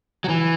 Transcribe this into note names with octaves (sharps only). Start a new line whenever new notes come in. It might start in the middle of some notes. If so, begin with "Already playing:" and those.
F#3
E3